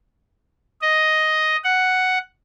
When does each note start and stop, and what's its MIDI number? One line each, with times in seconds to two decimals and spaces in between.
0.82 1.56 75
1.64 2.18 78